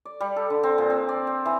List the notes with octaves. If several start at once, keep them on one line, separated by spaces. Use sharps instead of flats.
D5
G3
A4
D3
C4
A#2
C4
D5
G5
E3